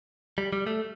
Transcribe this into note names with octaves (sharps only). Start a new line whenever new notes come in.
G3
G3
A3